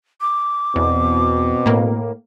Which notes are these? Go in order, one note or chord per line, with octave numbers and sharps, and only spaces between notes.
D6
E2 B2 C4
A2 A#3